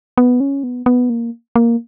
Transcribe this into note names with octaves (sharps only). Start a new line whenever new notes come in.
B3
C#4
B3
B3
A#3
A#3